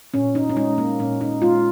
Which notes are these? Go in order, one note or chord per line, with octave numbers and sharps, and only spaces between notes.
A#2 C#4
D#4
C#4
G#3 D#4
A#3
A#2 C#4
D#4
G#3 F4